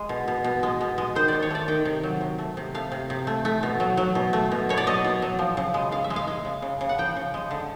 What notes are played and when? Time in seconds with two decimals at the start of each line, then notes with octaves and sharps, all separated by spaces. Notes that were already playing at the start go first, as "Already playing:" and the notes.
Already playing: G#3
0.09 B2
0.28 B2
0.44 B2
0.63 G#3
0.81 B2
0.98 G#3
1.15 D#3 C5
1.28 D#3 D5
1.42 C#5
1.50 A3 D5
1.68 D#3 G5
1.85 C3
2.03 F#3
2.21 C3
2.38 A3
2.57 C3
2.74 A3 F5
2.92 C3
3.10 C3
3.27 A3
3.45 A3
3.63 B2
3.80 F#3
3.97 F#3
4.15 B2
4.33 A3
4.52 B2
4.69 B2 C#5
4.77 D5
4.87 F#3 D#5
5.05 B2
5.22 F#3
5.39 F3
5.57 C#3
5.74 G#3
5.92 C#3 F5
6.04 E5
6.10 G#3
6.16 F5
6.28 G#3
6.45 C#3
6.62 C#3
6.81 C#3
6.89 F#5
6.98 F3 G5
7.16 C#3
7.34 G#3
7.51 D3